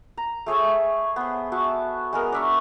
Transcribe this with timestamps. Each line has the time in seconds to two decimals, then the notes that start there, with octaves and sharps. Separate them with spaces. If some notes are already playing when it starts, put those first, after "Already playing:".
0.17 A#5
0.46 A3 G#4 C#5 E5
1.16 B3 C5
1.52 F#4 E5 A5
2.13 G#3 B3 A#4
2.32 D4 E5 C#6